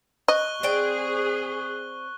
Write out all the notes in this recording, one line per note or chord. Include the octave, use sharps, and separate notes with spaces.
D#5 C#6 F#6 G7
C4 G#4 D5 G5